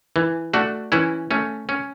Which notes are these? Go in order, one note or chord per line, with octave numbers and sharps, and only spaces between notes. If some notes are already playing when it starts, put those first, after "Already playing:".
E3
A3 D4 F#4
E3 C#4 E4
A3 C#4
C#4